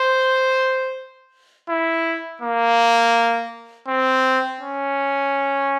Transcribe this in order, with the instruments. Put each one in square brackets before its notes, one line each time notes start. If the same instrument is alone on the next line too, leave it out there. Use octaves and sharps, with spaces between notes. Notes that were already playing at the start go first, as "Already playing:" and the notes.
Already playing: [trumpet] C5
E4
A#3
C4
C#4